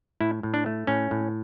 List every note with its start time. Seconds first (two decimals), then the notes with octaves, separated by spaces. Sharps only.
0.20 A2 E4
0.43 A2
0.54 D4
0.66 A3
0.87 A2 C#4
1.11 A2